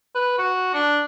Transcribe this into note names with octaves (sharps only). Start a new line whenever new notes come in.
B4
F#4
D4